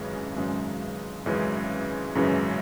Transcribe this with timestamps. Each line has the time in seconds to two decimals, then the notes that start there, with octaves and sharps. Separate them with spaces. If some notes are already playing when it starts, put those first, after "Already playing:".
Already playing: G#1 F#2 C#3 E3 G#3
0.36 G#1 F#2 C#3 E3 G#3
1.26 G#1 F#2 C#3 E3 G#3
2.15 G#1 F#2 C#3 E3 G#3